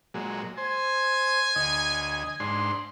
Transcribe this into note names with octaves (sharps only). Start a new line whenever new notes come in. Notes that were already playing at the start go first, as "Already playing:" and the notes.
A#2 F#3 G#3
C5 G#5
D2 D#5
G#2 D4 C6